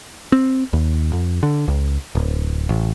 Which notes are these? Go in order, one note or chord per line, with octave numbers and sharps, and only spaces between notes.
C4
D#2
F2
D3
C#2
D1
A1